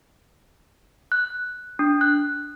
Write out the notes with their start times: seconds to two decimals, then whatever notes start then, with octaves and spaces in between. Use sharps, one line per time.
1.12 F#6
1.79 D4
2.01 F#6